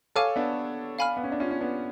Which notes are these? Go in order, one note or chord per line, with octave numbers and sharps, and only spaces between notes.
A4 C#5 F5 G#5 D6 F6
B3 D4
F5 G#5 B5 F6
B3
C#4
D4
C#4 F4
C#4
B3 D4